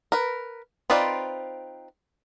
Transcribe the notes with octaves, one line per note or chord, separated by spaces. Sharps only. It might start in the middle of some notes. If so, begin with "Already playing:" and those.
A#4 B4
C4 D#4 F4 B4 D5